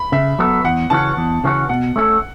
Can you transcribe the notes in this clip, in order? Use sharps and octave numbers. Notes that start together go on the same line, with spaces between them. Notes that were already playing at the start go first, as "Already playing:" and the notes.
Already playing: B5
C#3 E5
F#3 B3 F#4 A4
E2 F#5
C#3 E3 C#4 F#4 A5
E2
C#3 E3 C#4 F#4
B2 F#5
A3 C#4 A4